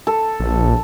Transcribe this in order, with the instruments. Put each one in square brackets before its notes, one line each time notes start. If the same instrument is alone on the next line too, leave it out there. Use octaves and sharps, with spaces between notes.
[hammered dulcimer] A4
[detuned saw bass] A#1